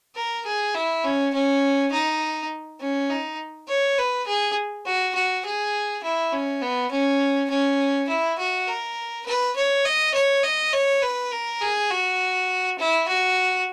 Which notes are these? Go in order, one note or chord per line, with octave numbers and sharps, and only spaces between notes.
A#4
G#4
E4
C#4
C#4
D#4
C#4
D#4
C#5
B4
G#4
F#4
F#4
G#4
E4
C#4
B3
C#4
C#4
E4
F#4
A#4
B4
C#5
D#5
C#5
D#5
C#5
B4
A#4
G#4
F#4
E4
F#4